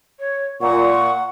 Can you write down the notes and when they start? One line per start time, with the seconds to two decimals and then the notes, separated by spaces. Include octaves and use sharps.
0.20 C#5
0.61 A#2 F#5 C#6